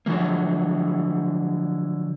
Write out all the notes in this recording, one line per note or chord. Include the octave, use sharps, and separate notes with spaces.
D3 F3 F#3 A#3